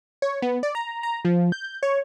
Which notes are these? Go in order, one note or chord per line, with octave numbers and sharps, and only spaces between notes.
C#5
B3
D5
A#5
A#5
F3
G6
C#5